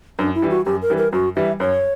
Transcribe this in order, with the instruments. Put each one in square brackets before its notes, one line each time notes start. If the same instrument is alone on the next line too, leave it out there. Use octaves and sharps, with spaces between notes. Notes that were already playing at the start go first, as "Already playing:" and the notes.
[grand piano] F#2 [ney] D4
[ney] E4
[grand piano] E3 G3
[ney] F#4
[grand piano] F#2 [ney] G4
[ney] A#4
[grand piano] E3 G3
[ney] A#4
[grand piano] F#2 [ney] F#4
[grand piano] E3 G3 [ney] E5
[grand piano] F#2 [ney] C#5